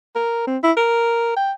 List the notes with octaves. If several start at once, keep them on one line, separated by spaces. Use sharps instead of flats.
A#4
C4
E4
A#4
G5